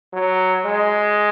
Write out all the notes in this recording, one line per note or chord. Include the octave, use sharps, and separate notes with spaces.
F#3
G#3